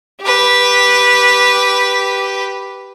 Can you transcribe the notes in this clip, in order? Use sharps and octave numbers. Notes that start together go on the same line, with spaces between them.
G4 B4